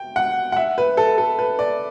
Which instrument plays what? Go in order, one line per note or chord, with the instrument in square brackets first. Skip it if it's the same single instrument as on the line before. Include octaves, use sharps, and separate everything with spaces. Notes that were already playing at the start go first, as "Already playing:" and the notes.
Already playing: [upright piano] G5
F#5
F#5
E5
B4
A4
A4
B4
D5